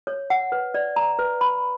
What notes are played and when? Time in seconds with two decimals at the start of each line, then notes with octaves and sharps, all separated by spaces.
0.07 C#5
0.30 F#5
0.52 B4
0.74 D5
0.96 A#5
1.19 B4
1.41 B5